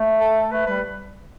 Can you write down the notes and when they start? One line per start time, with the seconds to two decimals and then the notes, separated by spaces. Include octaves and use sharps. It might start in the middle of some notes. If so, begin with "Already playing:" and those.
Already playing: A3
0.21 A4
0.51 A3 B4
0.66 G3 B4